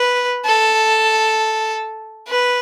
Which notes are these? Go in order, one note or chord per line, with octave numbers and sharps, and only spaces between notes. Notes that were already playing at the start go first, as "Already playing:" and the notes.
Already playing: B4
A4
B4